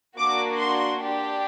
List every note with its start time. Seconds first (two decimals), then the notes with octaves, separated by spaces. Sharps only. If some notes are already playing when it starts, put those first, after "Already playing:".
0.18 A#3 D4 F#4 D6
0.59 C6
1.00 D4 G4